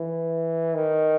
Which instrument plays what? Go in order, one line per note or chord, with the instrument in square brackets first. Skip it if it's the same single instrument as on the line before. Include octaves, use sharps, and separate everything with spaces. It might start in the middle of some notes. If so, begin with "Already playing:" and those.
Already playing: [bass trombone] E3
D#3